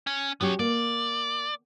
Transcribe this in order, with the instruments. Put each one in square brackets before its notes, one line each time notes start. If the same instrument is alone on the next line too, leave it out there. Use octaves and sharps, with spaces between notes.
[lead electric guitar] C#4
[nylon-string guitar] F#3 C#4 G4 [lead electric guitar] B3 C#5
[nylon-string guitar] A#3 [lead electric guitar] D5